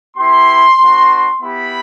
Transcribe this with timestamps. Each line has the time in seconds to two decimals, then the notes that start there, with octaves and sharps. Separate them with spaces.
0.17 B3 E4 G4 C6
0.80 B3 D4 F#4
1.41 B3 E4 G4 B5